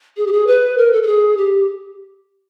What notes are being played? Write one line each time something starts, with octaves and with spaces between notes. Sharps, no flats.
G#4
G4
G#4
B4
A#4
A4
A4
G#4
G4